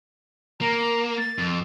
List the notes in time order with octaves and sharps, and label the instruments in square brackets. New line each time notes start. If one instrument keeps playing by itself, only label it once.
[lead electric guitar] A#3 [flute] A#5
[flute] A6
[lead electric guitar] F2